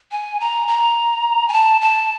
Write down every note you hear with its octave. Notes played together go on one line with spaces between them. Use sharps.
G#5
A#5
A#5
G#5
A5
A5